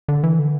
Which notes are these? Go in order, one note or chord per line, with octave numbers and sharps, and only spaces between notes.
D3
E3
D3